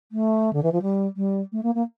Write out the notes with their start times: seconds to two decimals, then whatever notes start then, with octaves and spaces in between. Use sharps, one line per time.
0.12 A3
0.53 D3
0.63 E3
0.72 F3
0.82 G3
1.16 G3
1.52 A3
1.63 A#3
1.75 A#3